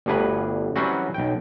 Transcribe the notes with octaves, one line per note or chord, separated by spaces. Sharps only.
G1 D2 G2 G#4 B4
E3 F#3 G3 C4 C#4 F#4
B1 G5